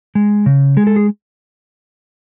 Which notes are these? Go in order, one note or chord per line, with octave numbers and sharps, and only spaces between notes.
G#3
C#3
G#3 G#4
A4
G#4